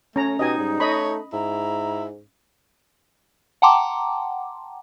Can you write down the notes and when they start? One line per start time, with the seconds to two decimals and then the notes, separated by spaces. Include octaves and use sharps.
0.16 A3 C#4 A#5
0.39 B2 D#4 G4 D#5 G#5
0.58 G#2 G3
0.80 A3 C#5 D#5 B5
1.33 G#2 E4 A#5
3.62 F#5 G5 A5 A#5 C6 D6